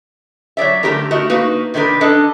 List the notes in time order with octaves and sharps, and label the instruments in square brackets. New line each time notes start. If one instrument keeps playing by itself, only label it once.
[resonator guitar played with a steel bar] F#3 C#5 D5 E5
D3 A3 C4 G4 A#4 A#5
A3 F#4 A#4 D#5
A#3 D#4 F#4 B4
C3 D#3 D4 A#4 B4
D4 G#4 A4 D#5